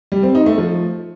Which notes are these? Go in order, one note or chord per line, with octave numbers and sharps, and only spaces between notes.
G3
C4
D#4
A3
F3